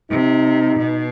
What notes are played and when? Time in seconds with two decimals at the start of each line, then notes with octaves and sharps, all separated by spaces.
0.10 C3 D#4
0.78 B2